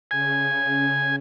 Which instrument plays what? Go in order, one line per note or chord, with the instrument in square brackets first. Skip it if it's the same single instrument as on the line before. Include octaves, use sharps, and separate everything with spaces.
[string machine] C#3 [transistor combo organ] G#5